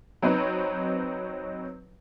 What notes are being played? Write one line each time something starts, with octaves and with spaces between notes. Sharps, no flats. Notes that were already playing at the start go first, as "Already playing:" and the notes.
F#3 C4 D#4 B4 C#5